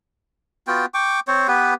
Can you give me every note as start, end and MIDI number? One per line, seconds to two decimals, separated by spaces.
0.67 0.86 59
0.67 0.86 65
0.67 0.86 66
0.67 0.86 79
0.94 1.20 79
0.94 1.20 85
0.94 1.20 86
1.28 1.47 60
1.28 1.47 72
1.28 1.47 73
1.48 1.74 59
1.48 1.74 67
1.48 1.74 71